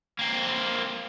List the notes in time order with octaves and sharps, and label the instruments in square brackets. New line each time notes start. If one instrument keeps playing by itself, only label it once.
[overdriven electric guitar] A#3 C4